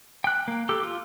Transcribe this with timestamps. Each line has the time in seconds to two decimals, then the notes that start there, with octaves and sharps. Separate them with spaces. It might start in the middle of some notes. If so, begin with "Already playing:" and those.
0.24 G5 F#6
0.48 A#3
0.69 G4 A4
0.83 F4